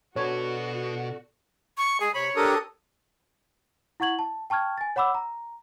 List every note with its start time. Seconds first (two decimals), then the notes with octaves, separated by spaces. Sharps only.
0.16 B2 D4 F#4 A4 B4 C#5
1.77 C#6
2.00 G#3 G#4
2.14 C3 C#5 B5
2.36 D4 G4 A4 A#4 D#6
4.00 E4 F#5 C#6 G#6 F#7
4.19 A5
4.50 G5 A5 C#6 F6 G#6
4.78 G#5 A6
4.96 C#5 F#5 B5 D6 E6
5.15 A#5